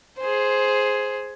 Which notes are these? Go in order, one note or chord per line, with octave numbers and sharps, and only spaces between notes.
G#4 C5